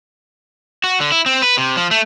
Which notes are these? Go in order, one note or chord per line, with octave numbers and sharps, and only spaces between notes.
F#4
D3
E4
C4
B4
C3
F3
A3